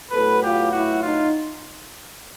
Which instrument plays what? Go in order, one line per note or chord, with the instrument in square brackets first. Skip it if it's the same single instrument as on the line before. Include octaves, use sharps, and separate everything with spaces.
[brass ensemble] A2 F#3 B3 A4 B4
F4 G4
E4 F#4
D#4 F4